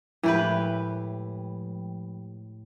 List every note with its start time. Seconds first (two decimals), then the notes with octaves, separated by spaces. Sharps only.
0.24 A2 F3 G#3 E4 G4 B4 G5